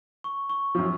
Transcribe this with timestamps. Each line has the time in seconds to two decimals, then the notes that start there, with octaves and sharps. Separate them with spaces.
0.24 C#6
0.50 C#6
0.75 F#2 F3